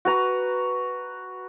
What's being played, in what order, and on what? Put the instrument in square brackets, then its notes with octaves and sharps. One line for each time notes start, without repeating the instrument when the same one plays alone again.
[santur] F#4 B4 A#5